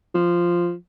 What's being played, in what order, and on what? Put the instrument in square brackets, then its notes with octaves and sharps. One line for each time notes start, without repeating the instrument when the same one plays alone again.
[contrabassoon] F3